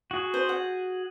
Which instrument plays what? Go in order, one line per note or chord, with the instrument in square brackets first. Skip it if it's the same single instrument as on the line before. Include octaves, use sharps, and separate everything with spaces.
[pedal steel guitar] F#4 G#4
[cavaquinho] C5
F#5